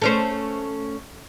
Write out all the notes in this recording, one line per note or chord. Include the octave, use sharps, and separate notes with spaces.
A3 C#4 C5